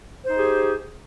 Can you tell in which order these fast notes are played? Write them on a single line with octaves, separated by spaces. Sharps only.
C5 D#4 G#4 G4